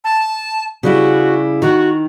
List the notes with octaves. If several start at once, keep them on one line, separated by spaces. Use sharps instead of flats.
A5
C#3 G3 E4 F#4
D#3 F#4